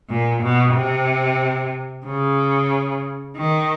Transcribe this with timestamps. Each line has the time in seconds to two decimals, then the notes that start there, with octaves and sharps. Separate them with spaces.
0.09 A#2
0.42 B2
0.75 C3
2.06 C#3
3.37 D#3